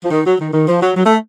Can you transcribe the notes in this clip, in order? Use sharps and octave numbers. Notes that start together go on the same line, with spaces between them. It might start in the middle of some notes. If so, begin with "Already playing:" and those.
F3
D#3
F#3
D#3
D#3
F3
F#3
F#3
A3